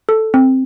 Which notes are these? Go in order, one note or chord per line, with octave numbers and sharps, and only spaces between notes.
A4
C4